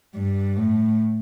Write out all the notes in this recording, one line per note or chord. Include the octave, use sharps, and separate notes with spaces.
G2
A2